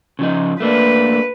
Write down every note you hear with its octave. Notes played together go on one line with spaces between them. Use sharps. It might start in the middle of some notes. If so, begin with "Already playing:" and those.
C#3 F3 D#4
A3 A#3 D4 B4